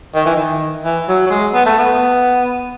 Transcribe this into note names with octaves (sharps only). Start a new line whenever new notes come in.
D#3
E3
D#3
E3
F#3
F#3
G#3
B3
A3
B3